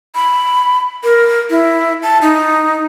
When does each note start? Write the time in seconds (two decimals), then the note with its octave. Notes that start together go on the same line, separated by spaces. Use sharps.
0.15 B5
1.04 A#4
1.50 E4
2.03 A5
2.22 D#4